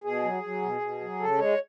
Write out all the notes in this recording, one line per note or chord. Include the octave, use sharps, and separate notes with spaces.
B2 G#4
F#3
F#3
B2
B2
F#3
C#3 A4
G#3 C#5